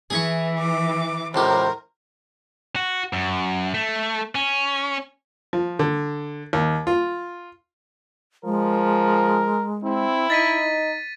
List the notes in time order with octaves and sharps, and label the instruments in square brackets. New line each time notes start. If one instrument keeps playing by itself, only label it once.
[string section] E3 [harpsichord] G#4 G#5 C#6
[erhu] D6
[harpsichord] C#2 A2 G4 [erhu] A#4 [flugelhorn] C5
[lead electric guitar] F#4
F#2
A3
C#4
[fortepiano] F3
D3
D#2
F4
[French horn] F3 [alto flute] G#3 [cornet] A#4
[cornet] C4 [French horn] E4
[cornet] D#4 [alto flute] D#5 [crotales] A6 B6 D#7